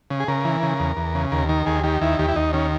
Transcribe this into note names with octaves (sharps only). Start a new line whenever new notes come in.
C#3
G#4
C#3 A#4
E3
C#3
E2
E2
C#3
D#2 A#4
D#3 A#4
D#2 G#4
D#3 G4
D#2 E4
D#2 G4
E4
D#2 D#4
D#3 C#4